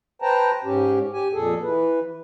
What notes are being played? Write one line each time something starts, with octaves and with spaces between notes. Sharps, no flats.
B4 C5 G5 A5 A#5
G#2 C#4 G4
G4 G#5
F2 A#2 G#4 A4
E3 B4